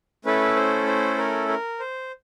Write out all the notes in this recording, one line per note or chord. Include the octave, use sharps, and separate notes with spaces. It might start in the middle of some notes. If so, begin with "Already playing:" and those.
A3 C#4 E4 A4 B4
C5
C5
A#4
A#4
C5